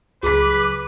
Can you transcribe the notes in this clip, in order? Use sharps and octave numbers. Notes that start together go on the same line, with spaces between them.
C#2 F#3 G#4 B4 D6 B6